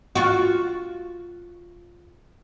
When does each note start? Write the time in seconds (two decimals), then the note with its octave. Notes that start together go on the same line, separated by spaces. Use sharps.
0.15 F4 F#4